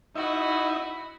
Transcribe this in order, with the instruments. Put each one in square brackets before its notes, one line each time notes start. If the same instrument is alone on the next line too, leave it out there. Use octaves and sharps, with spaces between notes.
[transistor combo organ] D#4 E5 [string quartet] E4 F#4 B5